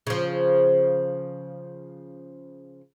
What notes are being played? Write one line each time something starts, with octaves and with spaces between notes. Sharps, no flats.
C#3 F3